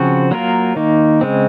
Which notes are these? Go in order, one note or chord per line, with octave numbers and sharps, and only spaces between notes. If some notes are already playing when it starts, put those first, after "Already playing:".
Already playing: C#3 F3 C4 F#4
F#3 A#3 F4 A#4
D#3 A#3 D#4
C#3 G#3 C4